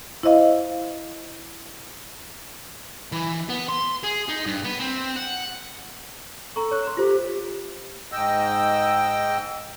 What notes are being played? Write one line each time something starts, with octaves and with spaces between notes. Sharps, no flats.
E4 C5 D#5 F5
E3
B3
C6
G#4
D#4
G2
B3
C4
F#5
A4 A#5 C#6
C#5 C#6 F#6
C6 E7
F4 G4 C5
G#2 D#5 G5 E6